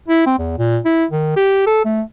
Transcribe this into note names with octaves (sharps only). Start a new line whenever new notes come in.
E4
C4
E2
A#2
E4
D#3
G4
A4
A3